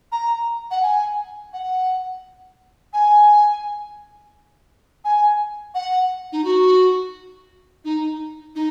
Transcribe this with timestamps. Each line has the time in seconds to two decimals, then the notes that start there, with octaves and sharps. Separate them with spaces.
0.12 A#5
0.71 F#5
0.82 G#5
1.53 F#5
2.93 G#5
5.05 G#5
5.74 F#5
6.32 D#4
6.44 F#4
7.85 D#4
8.55 D#4